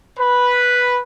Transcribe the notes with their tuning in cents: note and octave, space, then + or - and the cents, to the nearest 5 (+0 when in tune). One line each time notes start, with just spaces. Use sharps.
B4 -5